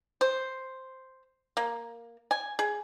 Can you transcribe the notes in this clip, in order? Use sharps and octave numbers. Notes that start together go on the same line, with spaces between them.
C5
A#3
G#5
G#4